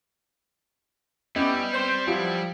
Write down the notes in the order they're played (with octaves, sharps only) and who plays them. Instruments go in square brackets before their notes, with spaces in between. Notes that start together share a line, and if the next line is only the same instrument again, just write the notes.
[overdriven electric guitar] G3 [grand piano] B3 [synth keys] C#4 D#5 [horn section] E4 G4
[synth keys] C4 C7 [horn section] C5
[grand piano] F3 G4 D7 [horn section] F#3 B3 E4